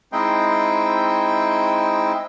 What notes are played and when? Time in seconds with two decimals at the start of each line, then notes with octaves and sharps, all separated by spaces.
0.12 G#3 C4 D#4 E4 C5 G5